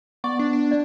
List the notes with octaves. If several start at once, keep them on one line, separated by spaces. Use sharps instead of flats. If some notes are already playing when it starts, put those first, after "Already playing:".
B3 D5 C#6
D4
D4
D5